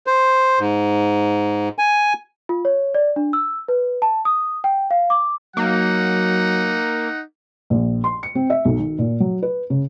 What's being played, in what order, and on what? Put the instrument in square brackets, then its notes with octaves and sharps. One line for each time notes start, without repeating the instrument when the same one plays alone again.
[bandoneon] C5
G#2
G#5
[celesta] F4
C#5
D5
D4
E6
B4
A5
D#6
G5
F5
D6
[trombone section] F#3 [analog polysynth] A#3 [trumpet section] D#4 F#5
[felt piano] A#1
C6
C#7
C4
E5
B1
D#3
A#2
F#3
B4
C#3